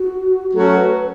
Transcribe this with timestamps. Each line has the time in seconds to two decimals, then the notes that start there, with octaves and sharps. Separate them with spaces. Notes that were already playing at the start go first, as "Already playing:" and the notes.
Already playing: F#4
0.54 F#3 A3 C#4 F#4 A4
0.77 B4